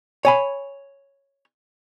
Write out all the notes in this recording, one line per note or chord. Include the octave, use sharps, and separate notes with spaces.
C#5 G#5 B5